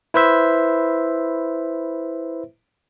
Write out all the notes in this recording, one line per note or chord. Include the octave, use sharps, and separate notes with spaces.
E4 B4 C5 E5